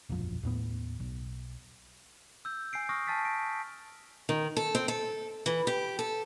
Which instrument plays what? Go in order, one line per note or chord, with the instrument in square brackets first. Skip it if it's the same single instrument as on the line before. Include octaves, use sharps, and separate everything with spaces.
[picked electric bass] E1 A#1 F#2 F3
D#2 A2 B3
B1
[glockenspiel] E6 G6
G#5 G6 C7 D7
C#6 D#6 F6 A#6
G#5 A5 F6 A6 B6 D7
D7
[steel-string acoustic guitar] D#3
A4
C4
A4
E3
G4
A4